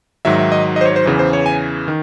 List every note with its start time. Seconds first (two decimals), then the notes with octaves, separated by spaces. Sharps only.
0.25 G#2 D#3 F#3 E5
0.39 E5
0.52 D#5
0.76 D#5
0.81 C5
0.85 C#5
0.96 C5
1.06 E2 C#3 E3
1.19 C5
1.33 C#5
1.46 G#5
1.88 D#3